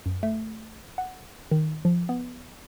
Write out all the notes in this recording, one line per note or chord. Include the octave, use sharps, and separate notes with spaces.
F#2
A3
F#5
D#3
F3
B3